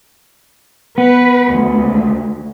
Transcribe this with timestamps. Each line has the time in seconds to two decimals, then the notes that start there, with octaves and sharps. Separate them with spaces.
0.98 B3 B4
1.52 D2